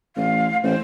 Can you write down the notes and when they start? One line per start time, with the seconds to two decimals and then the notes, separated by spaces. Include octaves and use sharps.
0.16 A1 F5
0.63 A1 C5